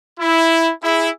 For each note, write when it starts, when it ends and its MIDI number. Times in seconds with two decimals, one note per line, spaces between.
0.20 0.72 64
0.84 1.09 64
0.84 1.09 68